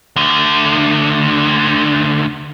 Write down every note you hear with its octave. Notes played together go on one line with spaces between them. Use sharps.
D2 D3